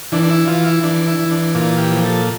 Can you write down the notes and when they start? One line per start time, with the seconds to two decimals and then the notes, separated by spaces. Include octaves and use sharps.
0.12 E3 D4
0.23 D4
0.30 E4
0.48 E3 F4
0.66 E4
0.83 E3 D4
1.08 E4
1.19 E3
1.31 D4
1.55 A#2 F4
1.78 G4
1.90 F3
2.02 A4